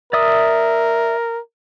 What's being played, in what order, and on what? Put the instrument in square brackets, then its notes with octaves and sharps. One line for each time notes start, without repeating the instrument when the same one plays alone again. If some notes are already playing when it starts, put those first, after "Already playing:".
[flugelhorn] A#4 [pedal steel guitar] D5 E5 D#6